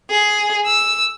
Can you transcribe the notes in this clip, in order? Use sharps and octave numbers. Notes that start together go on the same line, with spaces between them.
G#4
E6